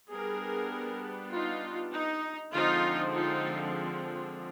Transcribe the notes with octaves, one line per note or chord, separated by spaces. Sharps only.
G3 B3 D4 G#4 A#4
D#4 F4
D#4
D3 F3 G#3 C4 D#4 F4
D#4 F4